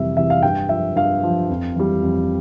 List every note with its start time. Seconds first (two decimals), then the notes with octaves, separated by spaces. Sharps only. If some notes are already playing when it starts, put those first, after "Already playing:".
Already playing: F2 C3 E3 G3 E5
0.17 C3 E3 G3 E5
0.30 F5
0.43 G2 G5
0.69 F3 E5
0.96 G2 F5
1.23 F3
1.50 F2
1.76 E3 G3
2.02 F2